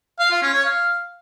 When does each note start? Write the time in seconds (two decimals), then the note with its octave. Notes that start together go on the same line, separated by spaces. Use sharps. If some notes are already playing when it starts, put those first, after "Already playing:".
0.19 F5
0.31 F4
0.42 C#4
0.54 C#5
0.65 F5